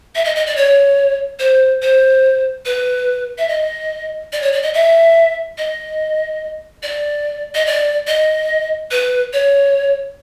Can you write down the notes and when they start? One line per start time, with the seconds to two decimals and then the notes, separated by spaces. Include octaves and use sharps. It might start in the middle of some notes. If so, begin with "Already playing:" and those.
0.15 E5
0.25 D#5
0.35 D#5
0.46 D5
0.56 C#5
1.39 C5
1.82 C5
2.65 B4
3.38 E5
3.48 D#5
4.32 D5
4.42 C#5
4.52 D5
4.63 D#5
4.74 E5
5.58 D#5
6.83 D5
7.55 D#5
7.66 D5
8.07 D#5
8.91 B4
9.33 C#5